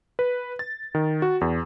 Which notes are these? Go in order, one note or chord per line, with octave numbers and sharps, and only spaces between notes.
B4
A6
D#3
F#4
E2